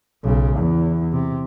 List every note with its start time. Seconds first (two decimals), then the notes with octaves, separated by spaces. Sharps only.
0.24 B1 C#3
0.57 E2
1.13 C3